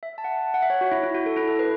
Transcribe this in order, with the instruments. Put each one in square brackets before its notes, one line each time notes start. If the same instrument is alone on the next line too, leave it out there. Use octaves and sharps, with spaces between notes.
[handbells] E5
A5
F#5
F#5
E5
C#5
F#4
E4
E4
F#4
A4
E4
A4
B4